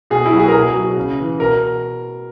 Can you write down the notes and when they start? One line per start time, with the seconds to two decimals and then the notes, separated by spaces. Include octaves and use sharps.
0.10 B2 G#4
0.26 E4
0.33 F#3
0.39 G#4
0.48 A#4
0.54 B2 G#4
0.75 F#3
0.97 C#3
1.18 E3
1.39 B2 A#4